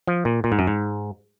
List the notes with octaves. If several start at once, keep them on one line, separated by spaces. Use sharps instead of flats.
F3
A#2
A#2
G#2
F#2
G#2